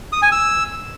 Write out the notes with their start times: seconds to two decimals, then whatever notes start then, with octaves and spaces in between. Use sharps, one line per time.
0.13 D#6
0.22 G#5
0.32 E6